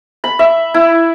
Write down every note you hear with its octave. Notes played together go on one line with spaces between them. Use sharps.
B5
E5
E4